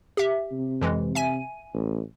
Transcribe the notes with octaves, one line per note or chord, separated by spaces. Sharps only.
G4 E5
C3
F2 E3 G#3
E5 G#5 D#7
A1